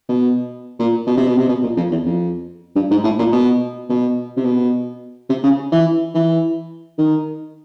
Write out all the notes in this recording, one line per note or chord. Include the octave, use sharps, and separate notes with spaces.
B2
A#2
B2
C3
B2
C3
B2
A#2
F2
E2
F2
G2
G#2
A2
A#2
B2
B2
C3
B2
C3
C#3
E3
E3
D#3